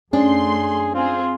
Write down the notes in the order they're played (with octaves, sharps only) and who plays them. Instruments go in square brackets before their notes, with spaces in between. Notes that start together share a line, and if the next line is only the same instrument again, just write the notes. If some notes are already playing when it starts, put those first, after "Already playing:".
[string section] F#2 A3 C6 [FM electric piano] C#4 [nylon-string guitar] D4 [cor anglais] G#4
[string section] C4 G#4 [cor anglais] F4